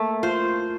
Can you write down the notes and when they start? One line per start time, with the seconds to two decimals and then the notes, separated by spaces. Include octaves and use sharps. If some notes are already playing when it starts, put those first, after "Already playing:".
Already playing: A3 A#3
0.23 F4 C5